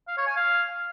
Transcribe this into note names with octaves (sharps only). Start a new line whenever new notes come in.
F5
C#5
G#5
F5